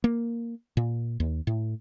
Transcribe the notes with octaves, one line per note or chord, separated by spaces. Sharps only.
A#3
A#2
D#2
A2